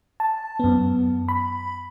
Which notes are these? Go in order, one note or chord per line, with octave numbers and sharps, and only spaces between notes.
A5
F#2 B3
B5